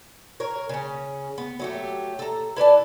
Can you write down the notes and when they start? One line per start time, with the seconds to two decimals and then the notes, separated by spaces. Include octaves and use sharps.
0.40 A#4 C#5
0.69 C#3 C#4
1.38 B3
1.59 F#3 A3 G4
2.19 A4 A#5
2.56 E4 B4 D5 A5